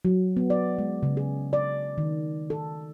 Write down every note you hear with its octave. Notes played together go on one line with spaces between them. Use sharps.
F#3
B3
D5
G#3
C#3
G#4
D5
D#3
A4